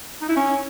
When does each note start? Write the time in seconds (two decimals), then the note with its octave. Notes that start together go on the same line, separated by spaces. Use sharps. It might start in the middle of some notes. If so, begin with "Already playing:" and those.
0.21 D#4
0.29 E4
0.37 C#4